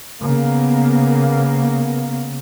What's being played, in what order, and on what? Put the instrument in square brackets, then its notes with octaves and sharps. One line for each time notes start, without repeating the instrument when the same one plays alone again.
[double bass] C#3 [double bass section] A#3 B3